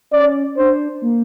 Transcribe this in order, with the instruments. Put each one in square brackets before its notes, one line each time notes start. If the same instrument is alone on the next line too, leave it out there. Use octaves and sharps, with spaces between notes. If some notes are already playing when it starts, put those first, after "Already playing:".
[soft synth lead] C#4 [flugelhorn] D5
[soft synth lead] D4 [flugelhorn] C5
[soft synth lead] A#3